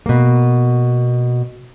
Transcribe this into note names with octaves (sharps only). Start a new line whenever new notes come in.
B2 A#3